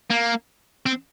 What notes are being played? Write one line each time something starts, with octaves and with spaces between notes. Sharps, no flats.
A#3
C4